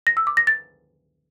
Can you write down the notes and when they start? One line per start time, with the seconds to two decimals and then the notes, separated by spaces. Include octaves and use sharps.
0.07 A#6
0.17 E6
0.27 D6
0.37 A#6
0.47 A6